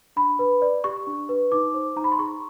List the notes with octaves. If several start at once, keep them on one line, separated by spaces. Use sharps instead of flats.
D4 B5
B4
D5
G4 C#6
D4
B4
D#4 D6
C5
D#4 A#5
B5
C6
G#4 C#6